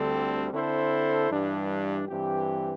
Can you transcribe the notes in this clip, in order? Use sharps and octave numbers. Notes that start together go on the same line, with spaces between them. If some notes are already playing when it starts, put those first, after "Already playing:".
Already playing: D2 D3 G3 C4 A4
D3 C4 E4 A4 C5
G2 E3 G3 D4
G2 E3 C4 G4